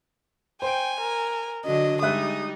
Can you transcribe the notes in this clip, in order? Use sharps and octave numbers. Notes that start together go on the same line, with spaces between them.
C5 G5 G#5 D7
A#4
D3 F#3 D4 D#5
G3 G#3 D#4 E5 D#6 F#6